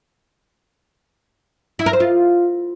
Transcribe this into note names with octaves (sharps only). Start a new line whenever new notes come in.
E4
A#4
C5
F4